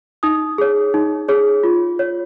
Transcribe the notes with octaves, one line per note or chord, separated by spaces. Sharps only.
D#4 D#6
G#4 C#5
D#4
G#4 C#5
F4
C#5